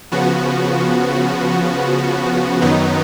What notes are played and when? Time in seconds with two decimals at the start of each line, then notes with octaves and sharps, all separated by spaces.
0.12 C#3 F3 B3 F#4
2.62 F#2 D#3 F#3 B3 D#4